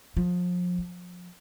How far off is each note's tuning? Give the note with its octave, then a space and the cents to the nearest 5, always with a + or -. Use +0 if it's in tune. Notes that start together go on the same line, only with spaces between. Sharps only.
F3 +35
F3 +30